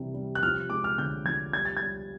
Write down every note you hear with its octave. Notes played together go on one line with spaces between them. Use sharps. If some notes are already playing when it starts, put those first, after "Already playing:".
Already playing: C3 E3 G3
G3
F#6
F3 F6
G#3 D6
F6
D3 G6
F3 G#6
G3 G#6
A6
G3 G#6